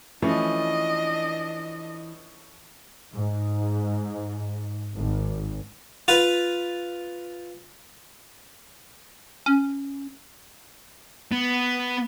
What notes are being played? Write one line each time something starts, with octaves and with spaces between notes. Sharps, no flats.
E3 F3 A3 C#4 D4 D#5
G#2
G#1
F4 B4
C#4
B3